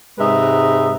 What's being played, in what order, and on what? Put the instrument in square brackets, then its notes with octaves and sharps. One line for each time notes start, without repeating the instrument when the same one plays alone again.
[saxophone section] G#2 C3 G#3 D#4 B4 E5